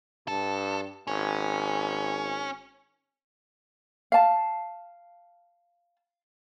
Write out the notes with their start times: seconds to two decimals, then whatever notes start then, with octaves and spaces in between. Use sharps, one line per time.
0.28 G2 A4
1.07 G#1 C#4
4.12 F5 A5